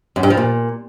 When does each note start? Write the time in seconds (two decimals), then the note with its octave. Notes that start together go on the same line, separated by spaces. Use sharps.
0.16 F#2
0.23 G2
0.30 F3
0.37 A#2